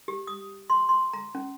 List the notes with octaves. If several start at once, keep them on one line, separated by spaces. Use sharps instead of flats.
G4
D#6
C6
C6
A#5
C#4